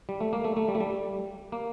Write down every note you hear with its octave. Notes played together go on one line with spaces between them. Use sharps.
G3
A3
A#3
A3
A3
G3
A3
G3
A#3